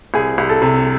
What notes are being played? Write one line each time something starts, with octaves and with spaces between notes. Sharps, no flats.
C2 G#4
C2
A4
C3